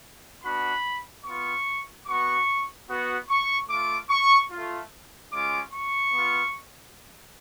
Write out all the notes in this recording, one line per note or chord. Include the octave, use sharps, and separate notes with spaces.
B3 D4 F#4 B5
B3 F4 C#6
B3 F#4 C#6
B3 F#4
C#6
A3 F4 D6
C#6
A3 F4
G#3 C#4 F4 D6
C#6
B3 F4